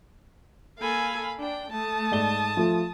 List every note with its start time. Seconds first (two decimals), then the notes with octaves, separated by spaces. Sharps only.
0.79 A#3 A4 F5 G#5 B5
1.40 D4 G5
1.72 A3 A5 D#6
2.11 G#2 D5 G7
2.57 F3 A3 F4